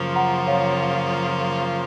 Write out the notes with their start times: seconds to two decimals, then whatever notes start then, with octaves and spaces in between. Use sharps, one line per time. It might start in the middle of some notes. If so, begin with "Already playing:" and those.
Already playing: F#2 C#3 F3 A#3 F4
0.15 F#5 A#5
0.47 C#5 F5